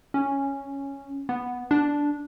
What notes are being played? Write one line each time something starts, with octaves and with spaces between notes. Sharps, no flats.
C#4
B3
D4